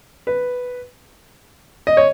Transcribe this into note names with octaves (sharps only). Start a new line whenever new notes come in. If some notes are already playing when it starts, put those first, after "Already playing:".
B4
D#5
C#5